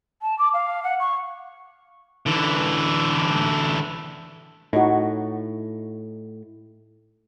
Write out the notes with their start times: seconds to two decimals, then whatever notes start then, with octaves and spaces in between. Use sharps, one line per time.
0.22 A5
0.39 D6
0.54 F5
0.83 F#5
1.00 C#6
2.26 D3 E3
4.73 A2 D#4 F#4